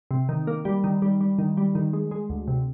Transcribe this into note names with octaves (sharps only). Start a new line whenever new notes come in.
C3
D#3
A#3
G3
D#3
G3
G3
D#3
G3
D#3
G#3
G#3
D2
C3